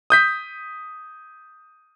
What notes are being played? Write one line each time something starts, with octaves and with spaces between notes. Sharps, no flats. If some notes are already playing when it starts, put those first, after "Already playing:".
D#6 G6 B6